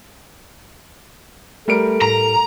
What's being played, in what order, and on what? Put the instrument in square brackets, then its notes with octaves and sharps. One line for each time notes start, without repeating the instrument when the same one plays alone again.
[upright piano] G3 A#4 D7 [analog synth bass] A3 [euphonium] A4
[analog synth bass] A2 [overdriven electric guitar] A#5